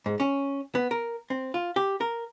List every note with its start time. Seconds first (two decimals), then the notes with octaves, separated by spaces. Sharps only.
0.06 G#2
0.20 C#4
0.75 B3
0.91 A#4
1.30 C4
1.54 F4
1.76 G4
2.01 A#4